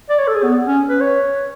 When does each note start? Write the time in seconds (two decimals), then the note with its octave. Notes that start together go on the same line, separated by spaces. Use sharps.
0.09 D5
0.19 C#5
0.27 A4
0.35 G#4
0.43 B3
0.67 C#4
0.89 B4
1.01 C#5